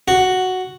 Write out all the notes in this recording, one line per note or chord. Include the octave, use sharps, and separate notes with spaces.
F#4